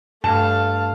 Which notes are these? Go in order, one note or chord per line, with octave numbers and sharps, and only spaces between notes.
G2 A3 F5 A5